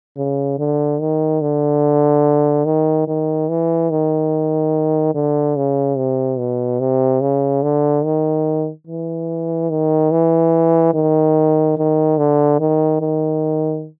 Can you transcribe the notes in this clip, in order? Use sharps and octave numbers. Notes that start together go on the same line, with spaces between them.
C#3
D3
D#3
D3
D#3
D#3
E3
D#3
D3
C#3
C3
B2
C3
C#3
D3
D#3
E3
D#3
E3
D#3
D#3
D3
D#3
D#3